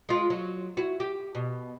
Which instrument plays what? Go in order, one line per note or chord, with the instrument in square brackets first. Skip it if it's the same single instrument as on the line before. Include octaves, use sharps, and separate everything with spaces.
[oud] G#3 F4
F#3
E4 F#4
G4
B2